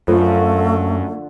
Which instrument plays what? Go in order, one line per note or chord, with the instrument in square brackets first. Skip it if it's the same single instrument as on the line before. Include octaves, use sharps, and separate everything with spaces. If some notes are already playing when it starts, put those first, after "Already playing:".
[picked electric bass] F#2 [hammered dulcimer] D3 F3 [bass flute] A3 [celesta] F4 A4 C5